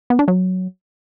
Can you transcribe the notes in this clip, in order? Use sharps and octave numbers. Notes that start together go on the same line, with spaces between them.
B3
D4
F#3